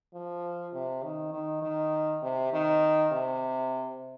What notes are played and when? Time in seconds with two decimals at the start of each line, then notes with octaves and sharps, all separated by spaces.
0.14 F3
0.73 C3
1.03 D#3
1.33 D#3
1.62 D#3
2.23 C3
2.53 D#3
3.11 C3